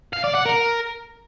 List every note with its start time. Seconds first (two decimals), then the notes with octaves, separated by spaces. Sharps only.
0.13 F5
0.24 D5
0.35 F#5
0.46 A#4